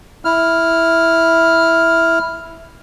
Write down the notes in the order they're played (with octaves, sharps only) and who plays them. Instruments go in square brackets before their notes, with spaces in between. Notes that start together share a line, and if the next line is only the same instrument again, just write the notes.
[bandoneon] E4 F6